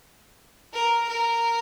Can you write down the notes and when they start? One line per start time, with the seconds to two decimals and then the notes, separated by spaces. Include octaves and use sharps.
0.73 A#4
1.09 A#4